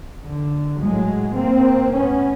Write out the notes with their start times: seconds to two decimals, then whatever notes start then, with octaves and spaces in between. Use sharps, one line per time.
0.25 D3
0.81 A2 F#3 G#3
1.38 A#3 C4
1.94 A2 B3 C#4